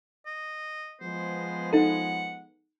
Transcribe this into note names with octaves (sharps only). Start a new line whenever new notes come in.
D#5
F3 G#3 B3 C5
D#4 A4 F#5